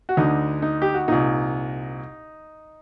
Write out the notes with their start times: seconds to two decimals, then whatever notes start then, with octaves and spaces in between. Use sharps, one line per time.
0.09 F#4
0.17 D2 D3 D#4
0.62 D#4
0.82 G4
0.94 F#4
1.08 C2 A#2 D#4